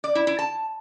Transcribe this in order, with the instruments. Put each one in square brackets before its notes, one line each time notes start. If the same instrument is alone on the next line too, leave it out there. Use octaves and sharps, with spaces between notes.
[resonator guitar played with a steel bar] D5
E4
E4
A5